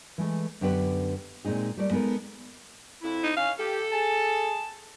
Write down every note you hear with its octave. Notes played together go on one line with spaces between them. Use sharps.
E3 G#3 A3
F#2 D3 B3 G4 A#4 B4
A#2 G#3 C4 D#4 G#4
G3 A3 A#4 D5
G#3 B3 D#4 A4 A#4
F2 E4
D#4
C#4 F5
G4 A4
G#4 A5